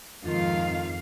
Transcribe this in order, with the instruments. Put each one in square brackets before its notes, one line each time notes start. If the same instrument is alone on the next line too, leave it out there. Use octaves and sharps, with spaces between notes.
[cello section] F2 G#2 F5 [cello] D#3 F4